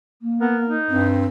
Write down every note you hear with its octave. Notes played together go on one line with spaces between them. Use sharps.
A#3
B3 A#4
D#4
G2 C4